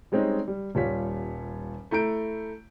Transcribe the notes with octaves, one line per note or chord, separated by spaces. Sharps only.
G3 G#3 C4 C#4 D#4
G3
D#1 G3 F4 C#5 B6
A3 E4 A#5 G6 D7